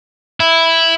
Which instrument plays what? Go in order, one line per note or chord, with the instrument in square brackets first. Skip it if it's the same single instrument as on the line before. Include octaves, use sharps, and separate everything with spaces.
[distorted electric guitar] E4